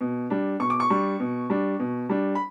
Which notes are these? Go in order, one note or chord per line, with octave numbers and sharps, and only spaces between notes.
B2
G3 D4
B2 C#6
D6
C#6
G3 D4
B2
G3 D4
B2
G3 D4
B5